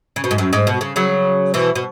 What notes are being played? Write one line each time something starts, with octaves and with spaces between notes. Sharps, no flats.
C#3
B2
G#2
F#2
G#2
B2
C#3
C#3 F#3
B2 E3
B2